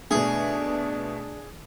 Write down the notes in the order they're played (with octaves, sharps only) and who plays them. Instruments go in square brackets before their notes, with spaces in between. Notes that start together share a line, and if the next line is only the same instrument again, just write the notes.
[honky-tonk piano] B2 A3 [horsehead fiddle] D4 [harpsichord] G#4